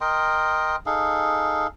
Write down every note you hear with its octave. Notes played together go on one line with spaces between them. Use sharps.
A#4 D#5 G5 C6
D#4 G#4 A4 F5